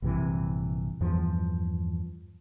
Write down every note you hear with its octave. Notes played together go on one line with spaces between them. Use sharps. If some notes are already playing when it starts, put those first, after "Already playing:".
A#1 G2 C3 E3
E2 G2 E3 F3